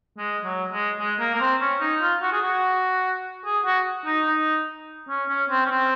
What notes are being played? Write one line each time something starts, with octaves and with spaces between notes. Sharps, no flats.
G#3
F#3
G#3
G#3
A#3
A#3
C4
C#4
D#4
F4
F#4
G#4
F#4
G#4
F#4
D#4
D#4
C#4
C#4
C4
C#4
C4